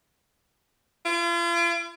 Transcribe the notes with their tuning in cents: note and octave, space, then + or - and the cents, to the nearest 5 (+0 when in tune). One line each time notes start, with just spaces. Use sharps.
F4 -40